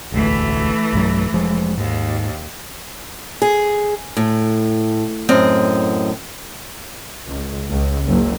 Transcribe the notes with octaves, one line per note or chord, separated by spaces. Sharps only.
E1 A1 D2 E3 A3
B1 G2 F#3
F1 F3 G#3
D#2 G#2
G#4
A2
F#2 A2 C4 D#5
C#2
C#2
F#1